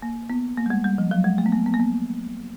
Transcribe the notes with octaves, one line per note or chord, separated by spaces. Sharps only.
A#3
B3
A#3
G3
G#3
G3
F3
F#3
G#3
A3
B3
A#3
B3
A#3
B3